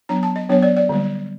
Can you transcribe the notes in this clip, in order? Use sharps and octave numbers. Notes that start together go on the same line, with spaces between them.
F#3 B3 D4 A#5
A5
D#5
F#3 B3 D4 C#5
D5
D5
D3 G3 A#3